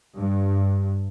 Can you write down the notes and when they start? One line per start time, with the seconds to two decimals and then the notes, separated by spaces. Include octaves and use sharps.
0.17 G2